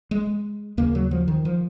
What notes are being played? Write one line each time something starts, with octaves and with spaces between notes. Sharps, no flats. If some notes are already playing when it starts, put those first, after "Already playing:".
G#3
D#2 C#3 A#3
F#3
F3
D#3
F3